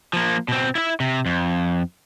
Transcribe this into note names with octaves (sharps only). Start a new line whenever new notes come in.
F3 A#3
B2 C4
E4 E5
C3
F2